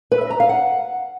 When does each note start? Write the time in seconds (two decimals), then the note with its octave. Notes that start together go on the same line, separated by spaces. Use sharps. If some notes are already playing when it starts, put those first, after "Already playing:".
0.12 B4
0.21 E5
0.30 A#5
0.40 F5
0.49 F#5